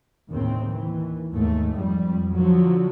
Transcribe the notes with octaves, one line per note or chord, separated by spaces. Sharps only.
D#2 A2 C#3 C4
D#2 E3
D#2 G#2 A3
F2 G3
D3 F3 F#3